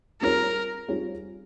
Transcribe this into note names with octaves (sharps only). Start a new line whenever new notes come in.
G3 C4 F4 G#4 A#4 C#5
G3 C4 F4 G#4 C#5